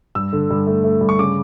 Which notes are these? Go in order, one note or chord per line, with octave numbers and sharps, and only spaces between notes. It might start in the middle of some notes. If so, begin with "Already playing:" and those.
G2 E6
D3
G2
A3
A3
G2
C#6
C#3 D6